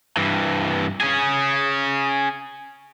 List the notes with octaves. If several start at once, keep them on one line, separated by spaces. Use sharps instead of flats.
G2 E3
C#4 G#4